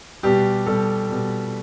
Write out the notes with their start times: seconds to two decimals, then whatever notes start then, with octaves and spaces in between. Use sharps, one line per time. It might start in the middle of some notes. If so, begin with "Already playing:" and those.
0.23 B2 G3 G4
0.66 B2 G3 A4
1.10 B2 G3